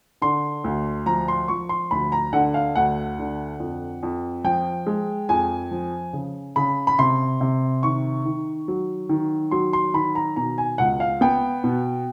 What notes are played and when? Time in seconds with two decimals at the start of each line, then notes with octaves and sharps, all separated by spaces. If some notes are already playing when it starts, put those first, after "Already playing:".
0.21 D3 C6
0.64 D2
1.06 F3 A#5
1.28 C6
1.48 F3 C#6
1.69 C6
1.91 D2 B5
2.12 A#5
2.33 D3 F#5
2.54 F5
2.76 D2 F#5
3.19 D3
3.60 F2
4.03 F2
4.44 F3 G5
4.86 G#3
5.29 F2 G#5
5.71 F3
6.13 C#3
6.56 C#3 B5
6.87 B5
6.99 C3 C6
7.41 C3
7.83 D#3 C#6
8.25 D#3
8.68 F#3
9.09 D#3
9.51 F#3 C6
9.73 C6
9.94 D#3 B5
10.15 A#5
10.36 B2 A#5
10.58 G#5
10.78 C#2 F#5
11.00 F5
11.21 B3 G5
11.64 B2